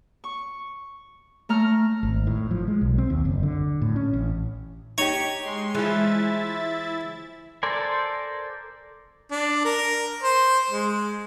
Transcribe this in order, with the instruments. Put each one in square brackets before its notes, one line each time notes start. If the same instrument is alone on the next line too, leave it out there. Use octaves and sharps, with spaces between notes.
[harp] C#6
A3 A#5 F6
[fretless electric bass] G#1
A2
F3
G#3
B1
C4
D#2
F#1
D3
A2
C#4
A1
[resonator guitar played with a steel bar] D#4 G4 [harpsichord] C#5
[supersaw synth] G#3 C6
[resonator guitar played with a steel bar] E3 F3 [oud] G#3 [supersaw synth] E4 E5 A6
[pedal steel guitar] A4 A#4 C5 D5 G#5
[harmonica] D4
A#4
C5
G#3